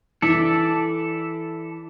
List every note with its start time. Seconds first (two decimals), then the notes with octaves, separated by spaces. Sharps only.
0.22 E3 A4 D5 E5